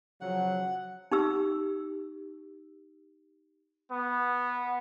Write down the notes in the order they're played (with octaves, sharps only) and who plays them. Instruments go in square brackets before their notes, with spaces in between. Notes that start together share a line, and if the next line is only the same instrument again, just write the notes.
[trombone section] C#3 F3 F#3 [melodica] F#5
[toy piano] D#4 G4 E6
[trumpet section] B3